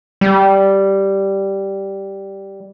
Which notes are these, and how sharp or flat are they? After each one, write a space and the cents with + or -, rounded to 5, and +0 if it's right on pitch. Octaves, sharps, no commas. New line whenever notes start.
G3 -5